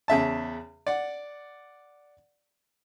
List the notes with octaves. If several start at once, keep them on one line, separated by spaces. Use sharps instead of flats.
E2 C#3 E5 A5
D5 F#5